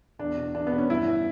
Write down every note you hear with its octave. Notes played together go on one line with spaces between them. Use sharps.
E2 D4
B2
E2 D4
B3
B2
C#4
G2 E4
E3